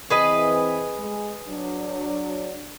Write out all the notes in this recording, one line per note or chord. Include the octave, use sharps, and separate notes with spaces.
E3 C4 G#4 B4 D#5
G#3
F#3 D4